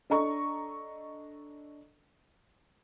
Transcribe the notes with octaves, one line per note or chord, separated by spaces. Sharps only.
D4 A4 D#5 A#5 C#6